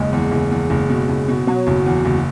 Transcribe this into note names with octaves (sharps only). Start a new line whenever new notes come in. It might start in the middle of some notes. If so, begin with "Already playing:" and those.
Already playing: F#1 G#3
E2
F#1
E2
F#1
B2
F#1
B2
B2 F#3
F#1
E2
F#1